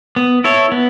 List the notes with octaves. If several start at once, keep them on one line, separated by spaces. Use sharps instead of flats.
B3
E4 A4 C#5
B3